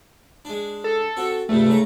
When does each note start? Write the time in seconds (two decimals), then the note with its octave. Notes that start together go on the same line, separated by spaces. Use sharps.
0.45 G#3 D4
0.84 A4
1.17 C4 F#4
1.49 C#2 G2 C3 A3
1.67 G#2 C#3 A#5